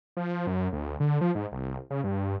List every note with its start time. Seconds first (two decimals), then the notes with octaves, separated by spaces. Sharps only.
0.17 F3
0.47 F#2
0.73 D2
1.00 D3
1.21 F3
1.35 G#2
1.52 C2
1.91 C#3
2.04 G2